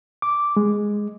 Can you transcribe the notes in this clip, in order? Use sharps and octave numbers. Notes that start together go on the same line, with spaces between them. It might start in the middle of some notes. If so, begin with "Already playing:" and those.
D6
G#3